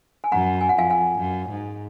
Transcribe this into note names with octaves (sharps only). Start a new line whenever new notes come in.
G#5
F#2 F#5 A#5
G#5
F#5
F2 F5 G#5
F5 G#5
F#2
G#2